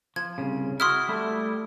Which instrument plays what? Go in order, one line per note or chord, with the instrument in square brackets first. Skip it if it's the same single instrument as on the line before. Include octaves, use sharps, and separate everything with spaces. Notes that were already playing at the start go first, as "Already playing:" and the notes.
[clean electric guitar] F3 [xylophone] G#6
[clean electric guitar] C2 C#3
[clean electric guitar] E4 F#4 [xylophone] C6 D#6 F6
[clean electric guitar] G3 A3 E4